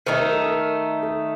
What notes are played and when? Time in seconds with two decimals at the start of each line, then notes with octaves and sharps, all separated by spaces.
0.06 D#3 A3 D#4 C5
0.20 A#4
0.33 A4
0.46 A#4
1.03 A4